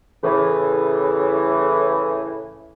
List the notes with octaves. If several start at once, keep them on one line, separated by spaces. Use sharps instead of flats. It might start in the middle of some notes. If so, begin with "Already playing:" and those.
A2 C#3 E3